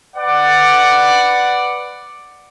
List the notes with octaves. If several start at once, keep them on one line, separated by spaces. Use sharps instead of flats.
B4 D5 F#5